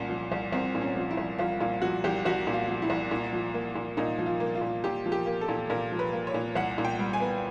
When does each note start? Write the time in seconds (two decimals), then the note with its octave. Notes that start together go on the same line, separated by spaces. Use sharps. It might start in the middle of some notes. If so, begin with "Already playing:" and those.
Already playing: C2 A#2 C#4
0.09 F3
0.32 C2
0.52 C2 C4
0.75 A#2
0.82 C#4
0.96 F3
1.11 E4
1.17 C2
1.39 C2 F4
1.60 A#2 F4
1.82 F3 F#4
2.04 C2 G4
2.25 C2 F#4
2.47 A#2
2.53 F4
2.68 F3
2.82 E4
2.90 C2
3.11 A#2
3.33 F3
3.54 A#3
3.75 A#2
3.97 A#2 D#4
4.19 F3
4.26 F4
4.40 A#3
4.55 F4
4.62 A#2
4.84 A#2 G4
5.06 F3
5.12 G4
5.26 A#3
5.41 A4
5.49 A#2
5.70 A#2 A#4
5.92 F3
5.99 B4
6.13 A#3
6.27 C#5
6.34 A#2
6.55 C2 F#5
6.78 A#2
6.85 G5
6.99 G3
7.13 G#5
7.20 B3